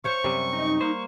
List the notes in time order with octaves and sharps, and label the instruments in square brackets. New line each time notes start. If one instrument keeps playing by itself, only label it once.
[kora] C5 C#5 F5 [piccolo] C#6
[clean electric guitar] F#2 C3 [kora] G3
[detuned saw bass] D#4
[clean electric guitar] A#3 C5